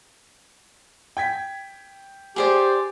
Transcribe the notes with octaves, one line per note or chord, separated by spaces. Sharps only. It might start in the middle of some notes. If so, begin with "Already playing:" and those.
G5 G#6 B6
G4 G#4 C5 D5 G#5